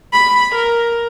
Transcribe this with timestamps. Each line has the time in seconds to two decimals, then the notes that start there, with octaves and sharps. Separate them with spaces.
0.13 B5
0.55 A#4